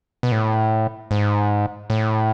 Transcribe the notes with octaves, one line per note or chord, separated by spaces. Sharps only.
B2
A2
G#2
A2